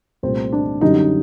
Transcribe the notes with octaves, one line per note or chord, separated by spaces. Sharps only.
C2 A#2 A3 C4
D4
F#2 D3 G3 D#4